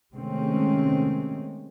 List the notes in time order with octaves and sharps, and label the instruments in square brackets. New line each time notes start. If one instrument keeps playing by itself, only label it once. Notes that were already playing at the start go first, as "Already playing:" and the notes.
[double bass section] C3 D#3 G#3 A3 C4 C#4